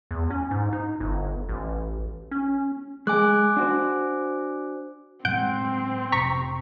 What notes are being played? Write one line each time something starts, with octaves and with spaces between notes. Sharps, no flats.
E2
C#4
G#2
D#4
G1
A1
C#4
G#3 G#5 D6 F#6
D4 F#4 C5
A2 F#3 G#3 C4 F#5 G6 D7
F1 C3 A#5 C#6 B6